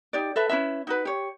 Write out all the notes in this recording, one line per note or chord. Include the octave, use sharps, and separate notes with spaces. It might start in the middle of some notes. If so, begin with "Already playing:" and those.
D#4 G4 D5
A4 B4 E5
C#4 E4 B4 E5
D#4 F#4 B4
G4 C#5